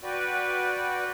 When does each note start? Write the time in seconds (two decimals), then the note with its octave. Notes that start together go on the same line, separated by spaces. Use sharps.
0.03 F#4 B4 D5 G5